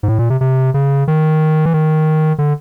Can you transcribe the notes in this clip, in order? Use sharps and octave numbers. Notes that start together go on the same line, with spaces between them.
G#2
A2
A#2
C3
C3
C#3
D#3
E3
D#3
D3